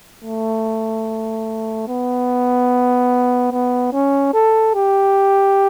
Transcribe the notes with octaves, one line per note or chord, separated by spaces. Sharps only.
A3
B3
B3
C#4
A4
G4